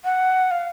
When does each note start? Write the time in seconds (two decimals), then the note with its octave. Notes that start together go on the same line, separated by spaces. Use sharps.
0.05 F#5
0.51 F5